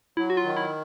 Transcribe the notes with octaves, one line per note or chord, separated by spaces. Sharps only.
F#3 E4
F#4
F4
D#3
E4